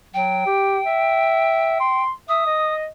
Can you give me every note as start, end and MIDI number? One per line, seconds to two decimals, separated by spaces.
0.14 0.44 54
0.14 2.03 79
0.46 0.79 67
0.85 1.78 76
1.80 2.12 84
2.29 2.45 76
2.29 2.74 87
2.47 2.87 75